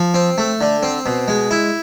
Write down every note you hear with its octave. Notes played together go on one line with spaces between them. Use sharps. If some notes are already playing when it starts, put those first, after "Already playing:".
Already playing: F3
C4
A3
D3
C4
B2
G#3
E4